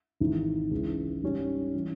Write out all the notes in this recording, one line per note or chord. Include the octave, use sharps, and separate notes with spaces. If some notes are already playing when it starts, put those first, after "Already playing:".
G#1 G#2 E3
C#2 C#3 E3
G#2 G3 C#4
E3 G3 C#4